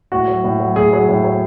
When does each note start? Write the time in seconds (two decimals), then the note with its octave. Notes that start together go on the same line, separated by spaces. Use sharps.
0.12 A2 F#4
0.28 F#3
0.44 A2
0.60 F#3
0.76 A2 G#4
0.93 F#3 G#4
1.09 A2
1.24 F#3